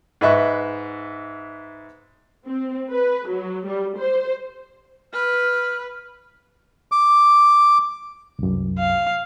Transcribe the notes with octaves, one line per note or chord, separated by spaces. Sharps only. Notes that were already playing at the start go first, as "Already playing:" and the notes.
G#2 B4 D#5 E5 C#6 F#6
C4
B4
F#3
G3
C5
B4 F6
D6
C2 F#2
F5